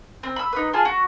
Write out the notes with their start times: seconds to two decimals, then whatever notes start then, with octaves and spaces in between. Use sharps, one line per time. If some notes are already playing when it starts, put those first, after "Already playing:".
0.23 C4
0.36 B5 E6
0.53 D#4 B4
0.73 F4 G#4 A5
0.85 F#4